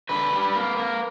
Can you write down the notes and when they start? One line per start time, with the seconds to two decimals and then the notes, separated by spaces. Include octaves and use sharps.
0.09 D3 B4
0.33 G3
0.55 A#3
0.77 A#3